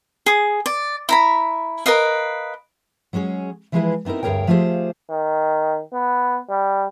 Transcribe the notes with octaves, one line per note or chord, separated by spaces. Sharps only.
G#4 D#6
D5
E4 A#5 B5
A#4 B4 D#5 F5
F#3 G#3 C#4 G#4 C#5
E3 F3 G#3 E4 G#4 B4
B3 C4 D#4 E4 A#4
D2 G2 G#4 A#4 C#5 G5
F3 A3 F4 G4 G#4 C5
D#3
B3
G3